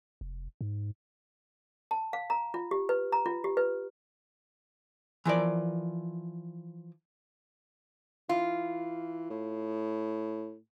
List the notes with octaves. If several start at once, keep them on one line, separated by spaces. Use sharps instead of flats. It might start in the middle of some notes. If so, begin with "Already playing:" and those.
F1
G#2
A5
F5
A#5
F4
G4
B4
A#5
F4
G4
B4
E3 F3 A#4 D5
E3 F4
A2